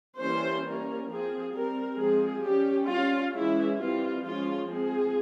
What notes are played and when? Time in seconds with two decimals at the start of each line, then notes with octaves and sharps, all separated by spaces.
0.21 E3 G3 A#3 C#4 C5
0.65 G3 A#3 C#4 A#4
1.11 F3 C4 G#4
1.55 G3 C4 A#4
2.00 F3 G#3 C4 G#4
2.44 G3 C#4 G4
2.90 G3 C#4 F4
3.35 E3 G#3 C#4 E4
3.79 E3 G3 C4 F4
4.24 F3 G#3 C#4 F4
4.68 F3 G#3 C4 G#4